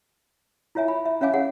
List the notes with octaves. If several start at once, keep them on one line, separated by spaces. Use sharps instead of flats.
E4 F4 C#5 E5 G#5
B5
E5
C#4 C#5 E5 F5 G#5 D6
G#4 C#5 F#5